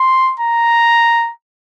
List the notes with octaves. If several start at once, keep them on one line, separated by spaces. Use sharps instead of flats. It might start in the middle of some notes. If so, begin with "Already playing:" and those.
Already playing: C6
A#5